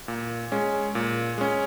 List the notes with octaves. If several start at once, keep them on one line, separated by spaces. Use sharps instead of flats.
A#2
G#3 C#4
A#2
G#3 C#4